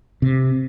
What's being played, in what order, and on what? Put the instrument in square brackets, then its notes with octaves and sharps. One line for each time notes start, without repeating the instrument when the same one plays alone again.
[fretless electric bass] C3